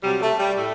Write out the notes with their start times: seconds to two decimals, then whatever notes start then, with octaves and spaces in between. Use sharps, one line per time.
0.03 C3 F#3 G3
0.21 A3
0.39 G3
0.58 A2 A3